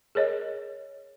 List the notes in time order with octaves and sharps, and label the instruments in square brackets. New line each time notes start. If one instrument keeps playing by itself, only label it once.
[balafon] G#4 A#4 C#5 D#5